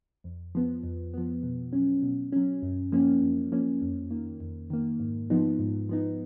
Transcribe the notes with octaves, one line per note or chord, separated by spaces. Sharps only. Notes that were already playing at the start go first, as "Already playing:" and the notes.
F2
F3 B3
F2
F3 B3
B2
F#3 C#4
B2
F#3 C#4
F#2
F3 A#3 C#4
F#2
F3 A#3 C#4
F2
D#3 A#3
F2
D#3 A#3
G#2
F3 B3 D#4
G#2
F3 B3 D#4